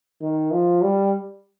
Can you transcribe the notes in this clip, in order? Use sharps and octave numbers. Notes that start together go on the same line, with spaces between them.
D#3
F3
G3